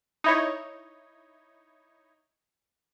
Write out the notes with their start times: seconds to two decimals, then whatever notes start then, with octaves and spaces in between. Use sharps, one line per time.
0.24 D#4 E4 C#5